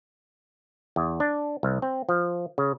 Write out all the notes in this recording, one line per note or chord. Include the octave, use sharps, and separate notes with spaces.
E2
D4
C2
C4
F3
C#3